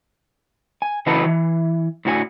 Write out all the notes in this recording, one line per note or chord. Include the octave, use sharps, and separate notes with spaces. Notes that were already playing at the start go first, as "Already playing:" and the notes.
G#5
C#3 E3 D#4 F#4 A4 B4
E3
A2 D3 F#4 C#5 G#5